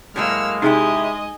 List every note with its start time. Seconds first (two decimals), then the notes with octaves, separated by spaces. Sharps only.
0.16 A2 F#3 G#3 A#3 F5 E6 F6
0.62 C3 D#4 E4 G4 G#4 D#5 G#5